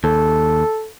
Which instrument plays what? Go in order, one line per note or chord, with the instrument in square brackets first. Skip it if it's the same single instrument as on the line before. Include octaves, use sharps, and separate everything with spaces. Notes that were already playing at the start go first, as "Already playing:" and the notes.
[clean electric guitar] D#2 [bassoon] A4